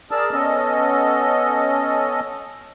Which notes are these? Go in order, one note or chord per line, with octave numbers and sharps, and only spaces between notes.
G#4 A#4 D5 A5 E6
B3 C#4 A4 D#5